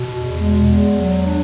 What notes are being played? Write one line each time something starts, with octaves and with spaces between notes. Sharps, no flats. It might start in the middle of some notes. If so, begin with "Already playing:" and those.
Already playing: B2
E2
G#3
E2
F#3
D4